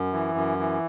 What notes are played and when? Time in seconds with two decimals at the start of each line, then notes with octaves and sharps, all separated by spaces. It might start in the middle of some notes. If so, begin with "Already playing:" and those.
Already playing: F#2
0.13 E3
0.35 F#2
0.58 E3